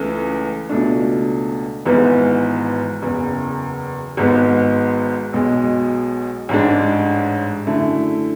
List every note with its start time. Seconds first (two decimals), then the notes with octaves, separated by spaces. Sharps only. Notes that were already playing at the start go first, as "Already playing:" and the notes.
Already playing: C#2 C#3 E3 A3
0.69 C#2 B2 A3 D4
1.85 G#1 G#2 E3 B3
3.02 F#1 E2 C#3
4.17 G#1 G#2 G#3 B3
5.33 B1 B2 G#3
6.49 A1 G#2 G#3 D4
7.66 F#2 D3 A3 E4